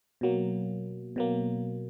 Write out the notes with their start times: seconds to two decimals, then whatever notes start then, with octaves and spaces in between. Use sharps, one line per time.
0.21 B2 F#3 A#3
1.16 B2 F#3 A#3